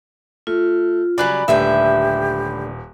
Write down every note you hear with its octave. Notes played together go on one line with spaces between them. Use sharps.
A3 F4
C#3 F#3 G3 D5 G#5 B5 F#6
D#1 D3 A3 G4 B4 E5